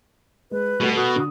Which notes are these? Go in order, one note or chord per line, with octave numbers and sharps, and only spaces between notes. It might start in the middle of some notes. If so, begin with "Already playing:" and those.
G#3 B4
B2 G3 A3 F#4
F#4 A4 D#6
D3 D#6